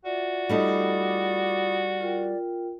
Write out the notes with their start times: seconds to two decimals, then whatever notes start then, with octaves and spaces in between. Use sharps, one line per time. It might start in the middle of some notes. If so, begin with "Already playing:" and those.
0.05 F4 F#4 D5 E5
0.49 G3 A3 D#4 F4 B5 D#6
2.01 F4 A#4 G5